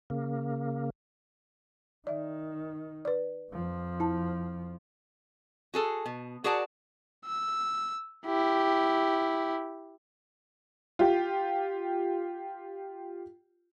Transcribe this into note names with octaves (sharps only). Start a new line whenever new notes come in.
C#3 A#3
D#3 D5 E5
B4 D5
F2 F3
E4 A5
F#4 G#4 A4
B2
F#4 G#4 A#4 D5 F#5 A5
E6
E4 G4
F4 G4